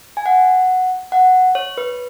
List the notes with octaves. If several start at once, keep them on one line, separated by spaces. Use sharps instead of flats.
G#5
F#5
F#5
C#5
B4